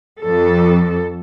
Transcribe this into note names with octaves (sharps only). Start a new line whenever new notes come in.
F2 A4